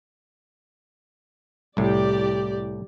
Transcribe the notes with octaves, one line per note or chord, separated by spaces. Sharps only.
C2 A2 G4 D5